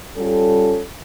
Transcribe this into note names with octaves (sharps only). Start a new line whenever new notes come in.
G3 C#4 F4 A4